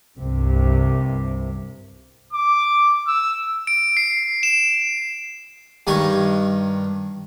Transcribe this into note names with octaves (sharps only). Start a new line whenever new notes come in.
C2 G2 C3
D6
E6
D7
C7
E7
G2 D#3 D#4 G#5 C#6